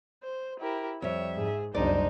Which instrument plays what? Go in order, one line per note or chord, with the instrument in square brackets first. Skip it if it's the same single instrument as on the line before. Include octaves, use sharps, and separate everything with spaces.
[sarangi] C5
[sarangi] E4 [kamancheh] G4 A#4
[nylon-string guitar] F2 G3 [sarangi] C#5 [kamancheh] E5
[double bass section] G#2 [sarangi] G#4
[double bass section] F#1 C2 F#2 [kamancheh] D4 D#4 [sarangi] C5 [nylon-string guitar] D5